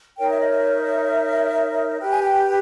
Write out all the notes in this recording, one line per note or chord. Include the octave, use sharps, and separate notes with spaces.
D#4 A#4 C#5 G5
E5
D#5
E5
G4 B4 G5
G#5
G5